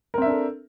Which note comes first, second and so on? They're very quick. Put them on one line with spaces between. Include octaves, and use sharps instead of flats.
A#4 C4 E5 D4 A4